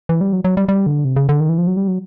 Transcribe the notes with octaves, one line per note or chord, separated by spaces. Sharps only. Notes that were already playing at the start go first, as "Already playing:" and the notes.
E3
G3
F#3
F#3
G3
G3
D3
C3
C#3
D3
D#3
E3
F3
F#3
G3
F#3